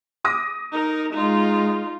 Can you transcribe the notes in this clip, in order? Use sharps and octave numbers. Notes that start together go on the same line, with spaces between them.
D6 D#6 A#6
D#4 A#4
G#3 D#4 F4